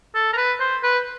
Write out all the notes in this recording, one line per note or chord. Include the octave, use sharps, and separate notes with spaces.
A4
A#4
B4
C5
B4